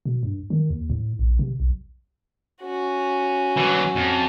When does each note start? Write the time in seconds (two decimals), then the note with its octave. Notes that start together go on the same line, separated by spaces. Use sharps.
0.06 B2
0.23 G2
0.50 D#3
0.70 D#2
0.90 A2
1.19 A#1
1.39 C3
1.60 B1
2.62 C#4 F#4
3.57 E3 F#3
3.95 F2